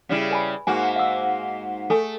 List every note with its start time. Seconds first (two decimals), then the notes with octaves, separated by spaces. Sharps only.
0.09 C#3 G3 E4
0.30 B4 G#5 B5
0.67 G#2 A#3 F#4 G#5
0.96 F5 E6
1.90 A3 A4 G#5